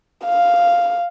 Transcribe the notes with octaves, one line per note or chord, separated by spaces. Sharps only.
F5